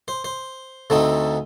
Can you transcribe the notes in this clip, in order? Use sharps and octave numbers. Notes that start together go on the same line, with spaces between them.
C5
C5
D2 D3 A3 C4 D#4